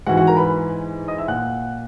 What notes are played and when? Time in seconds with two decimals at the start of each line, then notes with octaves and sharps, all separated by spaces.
0.07 G#2 E3 F#4 F#5
0.17 F#4 F#5
0.27 A#4 A#5
0.37 B4 B5
1.08 D#5 D#6
1.18 E5 E6
1.28 A#2 F#5 F#6